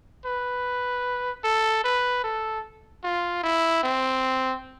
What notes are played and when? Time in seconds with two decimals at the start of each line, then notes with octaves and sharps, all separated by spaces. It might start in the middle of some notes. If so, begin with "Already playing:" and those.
0.25 B4
1.44 A4
1.84 B4
2.24 A4
3.04 F4
3.43 E4
3.83 C4